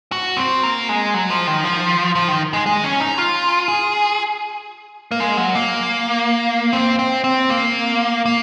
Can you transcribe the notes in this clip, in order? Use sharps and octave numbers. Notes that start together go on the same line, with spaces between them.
F#4
C4
A#3
G#3
F#3
F3
D#3
F3
F3
D#3
G#3
G#3
C#4
D#4
F4
G#4
A#3
G#3
F#3
A#3
C4
C4
C4
A#3
A#3